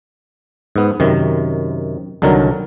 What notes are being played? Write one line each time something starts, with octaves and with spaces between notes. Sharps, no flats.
G#2 B3
F#2 C3 D#3
C2 D3 D#3 F#3 A#4